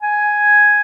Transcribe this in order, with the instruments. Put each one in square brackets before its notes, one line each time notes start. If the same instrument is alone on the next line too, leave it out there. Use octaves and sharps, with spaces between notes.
[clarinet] G#5